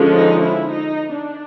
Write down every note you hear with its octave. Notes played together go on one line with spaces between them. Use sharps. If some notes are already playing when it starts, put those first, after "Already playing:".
Already playing: D3 F3 G#3 C#4
D#4
E4
D#4
D4